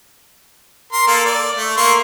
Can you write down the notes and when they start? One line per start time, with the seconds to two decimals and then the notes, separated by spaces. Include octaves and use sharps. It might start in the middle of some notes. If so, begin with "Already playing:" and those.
0.93 A#4 C6
1.07 A#3 A4
1.25 D5
1.56 A3
1.77 A#3 C6 C#6